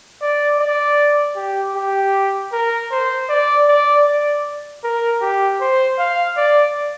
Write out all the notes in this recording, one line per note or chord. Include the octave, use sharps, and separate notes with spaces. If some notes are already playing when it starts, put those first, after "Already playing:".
D5
D5
G4
G4
A#4
C5
D5
D5
D5
A#4
G4
C5
F5
D5